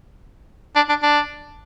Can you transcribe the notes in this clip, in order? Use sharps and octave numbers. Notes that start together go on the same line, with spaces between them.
D4
D4
D4